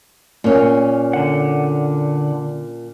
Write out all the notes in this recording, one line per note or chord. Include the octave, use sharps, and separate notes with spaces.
A#2 C#4
D3 F#5